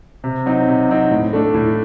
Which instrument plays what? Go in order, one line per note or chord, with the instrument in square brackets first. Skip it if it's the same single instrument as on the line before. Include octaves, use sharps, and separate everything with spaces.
[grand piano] C3
F#3 C4 D#4
C3
F#3 C4 D#4
A2
A3 D4
A2